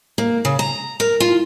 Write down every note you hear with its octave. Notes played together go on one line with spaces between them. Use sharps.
A#3
C#3
A#5
A#4
F4